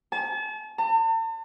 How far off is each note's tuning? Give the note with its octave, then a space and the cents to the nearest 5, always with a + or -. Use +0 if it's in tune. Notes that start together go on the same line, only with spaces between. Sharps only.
A5 -40
A5 +45